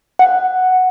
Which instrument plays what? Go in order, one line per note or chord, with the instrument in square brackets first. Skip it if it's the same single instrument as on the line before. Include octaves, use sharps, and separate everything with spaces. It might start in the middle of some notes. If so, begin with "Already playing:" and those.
[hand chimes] F#5